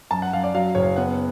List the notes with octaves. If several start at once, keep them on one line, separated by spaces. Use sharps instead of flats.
F#2 A5
F#5
F#2 F5
D5
F#3 F5
F#1 C#5
B3 F#5